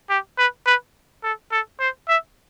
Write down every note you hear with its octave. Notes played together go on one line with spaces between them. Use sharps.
G4
B4
B4
A4
A4
C5
E5